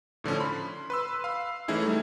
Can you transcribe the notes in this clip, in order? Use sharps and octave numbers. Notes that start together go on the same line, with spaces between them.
A2 D3 F3 C#4
B5 C6
B4 C6 E6
F5 B5
E3 A3 C#4 D#4 E4 G#4
G3 A3